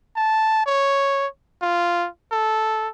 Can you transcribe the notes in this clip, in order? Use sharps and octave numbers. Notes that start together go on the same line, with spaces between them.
A5
C#5
F4
A4